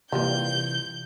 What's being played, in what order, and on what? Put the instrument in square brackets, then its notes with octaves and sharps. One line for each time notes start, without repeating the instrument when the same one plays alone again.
[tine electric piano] C3 E3 [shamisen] F3 G3 A#3 [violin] G6